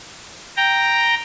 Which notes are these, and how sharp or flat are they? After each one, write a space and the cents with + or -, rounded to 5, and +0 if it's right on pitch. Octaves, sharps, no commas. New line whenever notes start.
G5 +0 A#5 +0